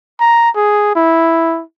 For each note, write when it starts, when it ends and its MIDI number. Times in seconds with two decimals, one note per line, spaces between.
0.20 0.50 82
0.56 0.92 68
0.96 1.62 64